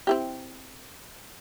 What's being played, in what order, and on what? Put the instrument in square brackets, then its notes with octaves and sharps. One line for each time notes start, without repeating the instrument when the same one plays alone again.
[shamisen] C4 E4 G4